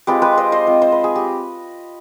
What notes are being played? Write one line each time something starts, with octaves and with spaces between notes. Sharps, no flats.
G#3 C4 F4 G4 B4
G4 B4
C5 D#5
C5 D#5
G#3 C4 F4
C5
B4
G#4
G4